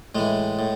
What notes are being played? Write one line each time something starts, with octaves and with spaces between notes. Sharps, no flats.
A2 E3 G#3
A2